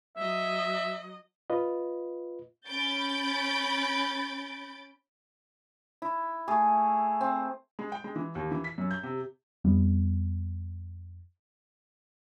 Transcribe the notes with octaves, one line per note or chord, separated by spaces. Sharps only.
F#3 D#5 E5
F4 B4 D#5
C#4 B5 G6 A6 D7
E4
A3 G#4
C4
G#3
G5
G#3
E3
D#2
E3
B6
F#2
G6
C3
F2 G3 B3